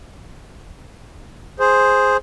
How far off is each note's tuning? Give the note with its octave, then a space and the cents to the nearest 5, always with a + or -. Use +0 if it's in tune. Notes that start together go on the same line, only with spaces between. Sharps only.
G#4 +0 C5 +0